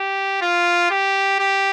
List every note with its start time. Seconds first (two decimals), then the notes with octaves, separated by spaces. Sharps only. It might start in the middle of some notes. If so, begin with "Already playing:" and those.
Already playing: G4
0.41 F4
0.91 G4
1.39 G4